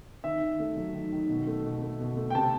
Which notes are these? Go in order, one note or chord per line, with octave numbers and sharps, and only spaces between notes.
D#3 E5
D#3
A3
F#3
D#3
D#3
B2
A3
B2
A3
B2
A3
G5
C3 A5